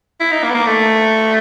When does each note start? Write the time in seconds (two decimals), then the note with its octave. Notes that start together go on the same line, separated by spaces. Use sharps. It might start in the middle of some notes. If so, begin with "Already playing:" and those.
0.20 E4
0.32 D#4
0.43 A#3
0.50 B3
0.55 A#3
0.66 A3